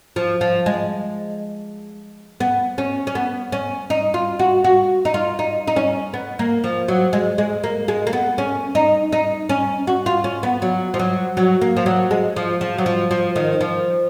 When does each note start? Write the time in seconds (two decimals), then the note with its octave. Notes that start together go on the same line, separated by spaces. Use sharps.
0.16 F3
0.41 F3
0.66 G#3
2.40 B3
2.78 C#4
3.07 C#4
3.15 B3
3.52 C#4
3.90 D#4
4.14 F4
4.39 F#4
4.64 F#4
5.05 D#4
5.14 F4
5.39 D#4
5.67 D#4
5.76 C#4
6.14 B3
6.39 A#3
6.64 F3
6.88 F#3
7.13 G#3
7.38 G#3
7.64 A#3
7.88 G#3
8.07 A#3
8.13 B3
8.38 C#4
8.75 D#4
9.12 D#4
9.49 C#4
9.87 F#4
10.06 F4
10.24 C#4
10.43 B3
10.62 F#3
10.94 F3
10.99 F#3
11.37 F#3
11.61 A#3
11.77 F3
11.86 F#3
12.11 G#3
12.36 F3
12.61 F3
12.78 F#3
12.86 F3
13.11 F3
13.36 D#3
13.61 F3